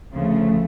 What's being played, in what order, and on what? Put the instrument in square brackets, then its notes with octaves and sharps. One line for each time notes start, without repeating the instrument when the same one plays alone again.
[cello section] D2 C#3 F3 A3